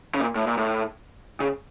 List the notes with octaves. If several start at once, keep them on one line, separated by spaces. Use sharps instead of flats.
C#3
A#2
A2
A#2
A2
C#3